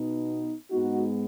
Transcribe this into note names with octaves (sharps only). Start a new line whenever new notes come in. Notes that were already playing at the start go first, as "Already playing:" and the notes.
Already playing: B2 B3 D#4
G#2 G#3 B3 D#4 F#4